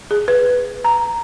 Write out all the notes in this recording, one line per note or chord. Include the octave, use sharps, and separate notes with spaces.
G#4
B4
A#5